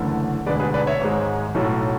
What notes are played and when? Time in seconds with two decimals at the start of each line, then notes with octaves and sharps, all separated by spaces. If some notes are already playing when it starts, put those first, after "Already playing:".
Already playing: F#1 E2 D3 A3
0.46 E1 D2 D3 G#3 B4 D5
0.60 G#4 B4
0.74 B4 D5
0.87 C#5 E5
1.01 G#1 G#2 G#3
1.55 B1 A2 F#3 A3